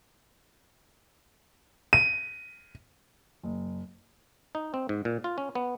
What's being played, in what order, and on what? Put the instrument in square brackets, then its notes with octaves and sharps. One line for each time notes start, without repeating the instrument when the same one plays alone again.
[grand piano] D#7
[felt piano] F#1
[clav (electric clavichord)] D#4
C4
G#2
A#2
F4
C#4
B3